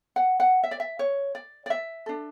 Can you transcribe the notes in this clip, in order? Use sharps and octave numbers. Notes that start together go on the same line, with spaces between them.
F#5
F#5
E5
D5
E5
C#5
D5
D5
E5
D4 A4